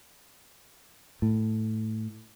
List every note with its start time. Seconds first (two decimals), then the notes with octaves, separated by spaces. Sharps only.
1.22 A2